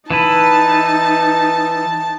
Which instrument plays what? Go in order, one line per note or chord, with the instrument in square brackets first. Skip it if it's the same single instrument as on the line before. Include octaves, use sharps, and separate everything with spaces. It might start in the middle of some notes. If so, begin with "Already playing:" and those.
[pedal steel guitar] E3 E4 B4 [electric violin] D#4 [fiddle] A5